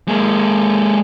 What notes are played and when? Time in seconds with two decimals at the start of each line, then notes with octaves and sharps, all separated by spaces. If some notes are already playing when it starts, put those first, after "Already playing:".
0.08 G#3 A#3